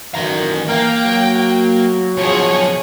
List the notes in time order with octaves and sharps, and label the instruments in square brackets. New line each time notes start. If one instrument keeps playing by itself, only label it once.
[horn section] F#2 A2 D#3 [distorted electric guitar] E3 A#5
[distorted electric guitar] A#3 [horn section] A#4 F5 [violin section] G5
[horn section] F#3
[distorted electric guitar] B1 F3 [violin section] G#4 C#5